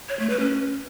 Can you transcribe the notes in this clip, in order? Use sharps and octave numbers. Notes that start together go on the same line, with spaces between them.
C#5
A3
B4
C#4